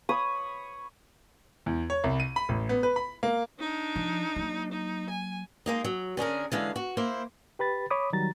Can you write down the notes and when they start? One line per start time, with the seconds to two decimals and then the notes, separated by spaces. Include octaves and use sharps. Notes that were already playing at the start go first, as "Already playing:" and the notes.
0.09 C#5 B5 D#6
1.66 E2
1.90 C#5
2.04 C2
2.20 D#7
2.36 B5
2.49 A1
2.69 B3
2.83 B4
2.96 B5
3.23 A#3
3.60 D4 D#4
3.96 F3
4.36 F#3 A#3
4.72 D#4
5.10 G#5
5.66 G#3 A#3 D#4
5.84 F#3
6.17 D3 C#4 G#4 A#4
6.52 D3 E3 G#3 F5
6.76 F#4
6.97 A#3 E4 C5
7.59 G4 B4 B5 A6
7.91 C#5 B5 D6 D#6
8.13 D#3 F#3 G3 A#5 A6